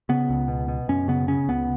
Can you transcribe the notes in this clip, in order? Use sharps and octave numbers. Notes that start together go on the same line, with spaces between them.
C#3 B3
C#2
B2
B2
F#2 C#4
C#3 B3
C#3 C#4
C#2 B3